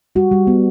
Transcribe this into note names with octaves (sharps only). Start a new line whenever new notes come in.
G3 F#4
G3
B3